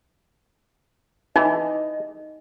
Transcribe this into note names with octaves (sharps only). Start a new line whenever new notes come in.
E3 D#4 D#5